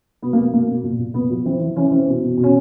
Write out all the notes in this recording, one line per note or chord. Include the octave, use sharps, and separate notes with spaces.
B2 B3
A#3
B2 B3
B2 A#3
B2
A#2
A#2
A#2 B3
F3
E3 C4
E3
E3 C#4
E3 C4
B2
B2
B2
C#4